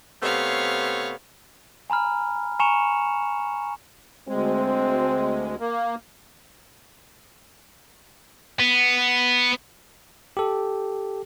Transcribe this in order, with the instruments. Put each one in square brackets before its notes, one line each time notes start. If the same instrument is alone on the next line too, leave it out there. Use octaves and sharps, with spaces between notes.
[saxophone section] C3 A3 B3 [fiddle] C#5 F5
[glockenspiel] G#5 A#5 B5 F6
G#5 A#5 C#6 C#7 E7 F7
[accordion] D2 G#3 [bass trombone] C4
[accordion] A#3
[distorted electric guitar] B3
[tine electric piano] G4 A4